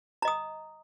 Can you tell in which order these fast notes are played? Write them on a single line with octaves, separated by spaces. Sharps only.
A#5 D#5 D#6